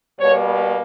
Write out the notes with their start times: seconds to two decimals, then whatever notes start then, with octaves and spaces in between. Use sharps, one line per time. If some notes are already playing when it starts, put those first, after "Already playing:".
0.20 B2 G3 A#3 C#5